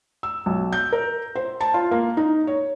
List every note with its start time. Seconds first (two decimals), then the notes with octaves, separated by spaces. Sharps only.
0.23 E6
0.46 B1
0.73 G6
0.92 A#4
1.35 C5
1.61 A5
1.74 F4
1.91 A#3
2.17 D#4
2.47 C#5